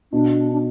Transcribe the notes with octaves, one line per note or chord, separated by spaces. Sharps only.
B2 D4
D4